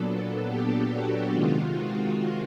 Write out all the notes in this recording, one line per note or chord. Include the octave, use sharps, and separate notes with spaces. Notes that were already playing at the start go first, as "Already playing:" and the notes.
Already playing: A#2 F#3 B3 D4 A4
G4
F#4
C3 D#3 G#3 F4
F#4